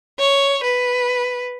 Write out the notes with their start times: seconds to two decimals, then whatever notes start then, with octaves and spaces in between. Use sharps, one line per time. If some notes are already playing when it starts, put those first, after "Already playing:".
0.19 C#5
0.63 B4